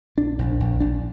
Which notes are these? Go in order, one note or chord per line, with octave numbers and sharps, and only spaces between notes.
A#1 D4
A#1
A#1
A#1 D4